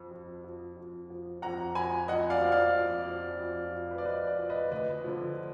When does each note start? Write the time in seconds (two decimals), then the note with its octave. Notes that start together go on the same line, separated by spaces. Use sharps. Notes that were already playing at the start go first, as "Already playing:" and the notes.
Already playing: F2 F3
0.11 F2
0.44 F3
0.77 F2
1.10 F3
1.42 F2 F#5 A#5
1.75 F3 G#5 B5
2.08 F2 D#5 F#5
2.30 D5 F5
2.41 F3
2.52 D5 F5
2.74 F2
3.07 F3
3.40 F2
3.72 F3
3.91 B4
3.98 D5
4.05 F2 B4 D#5
4.27 D5
4.39 F3
4.50 B4 D#5
4.71 D2 B4 D#5
5.04 D3 F3